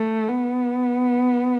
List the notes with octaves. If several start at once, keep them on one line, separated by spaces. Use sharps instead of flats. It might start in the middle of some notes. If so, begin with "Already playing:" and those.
Already playing: A3
B3